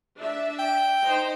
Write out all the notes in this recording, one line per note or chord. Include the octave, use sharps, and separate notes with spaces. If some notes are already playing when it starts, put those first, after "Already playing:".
D4 E5
G5
D#4 C5